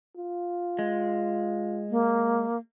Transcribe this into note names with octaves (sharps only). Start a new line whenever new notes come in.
F4
G#3
A#3